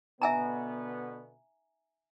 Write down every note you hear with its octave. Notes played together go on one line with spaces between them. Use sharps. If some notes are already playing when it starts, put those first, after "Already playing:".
B2 D3 B3 E5 G#5 A#5